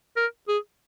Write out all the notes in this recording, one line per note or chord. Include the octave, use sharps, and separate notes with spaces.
A#4
G#4